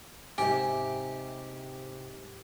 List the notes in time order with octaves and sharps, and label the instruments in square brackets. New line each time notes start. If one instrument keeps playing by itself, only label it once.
[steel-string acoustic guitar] G#2 [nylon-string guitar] C3 E5 [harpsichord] G4 [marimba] G#5